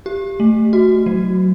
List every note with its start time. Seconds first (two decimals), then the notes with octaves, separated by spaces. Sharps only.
0.06 G4
0.40 A3
0.73 F#4
1.06 F#3